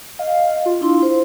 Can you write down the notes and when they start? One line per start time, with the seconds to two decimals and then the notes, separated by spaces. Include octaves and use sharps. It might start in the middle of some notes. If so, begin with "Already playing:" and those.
0.19 D#5 F5
0.66 F4
0.81 D4 E4 C6
1.03 C5